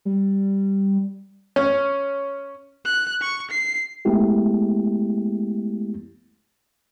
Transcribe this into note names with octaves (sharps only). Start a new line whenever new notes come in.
G3
C#4
F#6
C#6
C7
G#3 A3 B3 E4 G4